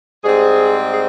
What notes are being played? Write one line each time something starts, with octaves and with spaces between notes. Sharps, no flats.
G#2 G3 C4 G#4
G#4